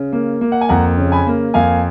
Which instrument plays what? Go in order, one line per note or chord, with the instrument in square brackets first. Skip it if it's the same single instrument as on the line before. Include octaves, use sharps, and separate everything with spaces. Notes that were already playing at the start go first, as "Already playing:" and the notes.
Already playing: [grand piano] C#3
A#3
A#3
F#5
G#5
F2 F#5 A#5
C#3
G#5 B5
A#3
F2 F5 G#5